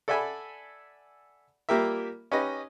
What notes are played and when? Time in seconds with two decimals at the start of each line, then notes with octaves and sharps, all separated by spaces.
0.08 A4 D5 E5 F#5 G#5 B5
1.69 G3 A#3 F4 G4 A#4 E5
2.32 C#4 D#4 G4 B4 D#5